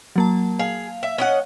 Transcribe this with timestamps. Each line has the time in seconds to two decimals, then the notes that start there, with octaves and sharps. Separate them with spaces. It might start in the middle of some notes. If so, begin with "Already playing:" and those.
0.16 F#3 A#3 A5
0.59 G#4 F5
1.03 E5
1.18 C#4 D#5 F#5